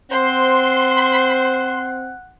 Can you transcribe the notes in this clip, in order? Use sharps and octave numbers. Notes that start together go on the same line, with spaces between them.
C4 C5 F#5 C6